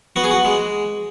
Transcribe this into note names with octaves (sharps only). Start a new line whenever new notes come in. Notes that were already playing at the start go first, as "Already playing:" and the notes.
B3 F#4
G#4
F#4
G#3